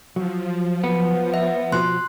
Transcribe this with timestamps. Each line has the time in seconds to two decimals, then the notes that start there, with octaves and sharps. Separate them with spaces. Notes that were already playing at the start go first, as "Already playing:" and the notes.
0.16 F3 F#3
0.84 B3
1.34 E5
1.72 B2 F3 F#4 C6 F#6